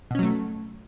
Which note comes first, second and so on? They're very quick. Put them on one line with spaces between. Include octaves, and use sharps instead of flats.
B2 C#4 F#3 A3